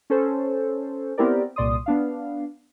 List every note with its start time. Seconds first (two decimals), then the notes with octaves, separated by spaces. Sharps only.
0.10 C#4 A4 C5
1.18 B3 C4 E4 G4 A#4 D5
1.56 C2 A#2 D5 C6 D#6
1.86 B3 D4 F5